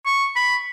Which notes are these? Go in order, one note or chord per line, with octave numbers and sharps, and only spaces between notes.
C#6
B5